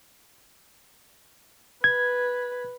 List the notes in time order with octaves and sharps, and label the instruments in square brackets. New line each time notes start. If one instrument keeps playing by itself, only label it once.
[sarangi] B4 [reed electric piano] G#6